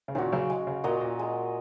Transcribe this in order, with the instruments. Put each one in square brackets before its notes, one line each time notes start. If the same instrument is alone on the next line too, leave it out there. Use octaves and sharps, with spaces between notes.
[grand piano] C#3
[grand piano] A#2 D#3 [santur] C#4 F#4
[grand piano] C#3 F#3
[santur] G#3
[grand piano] C#3
[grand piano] A#2 [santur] F#4 A#4 D#5
[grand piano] A#2
[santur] G#3